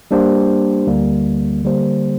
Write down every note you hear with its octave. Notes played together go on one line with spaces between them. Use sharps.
G3 A#3 D4 G4 C5
D2 D3 G3 A#3
D3 G3 A#3 G4 C5